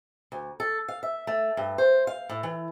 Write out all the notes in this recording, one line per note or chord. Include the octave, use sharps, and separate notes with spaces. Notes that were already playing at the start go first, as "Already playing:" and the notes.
D2
A4
F5
E5
A3
G2
C5
F5
A2
E3